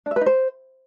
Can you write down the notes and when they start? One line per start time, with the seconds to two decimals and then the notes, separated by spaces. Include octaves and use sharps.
0.06 D4
0.11 E5
0.16 B4
0.21 D#4
0.26 C5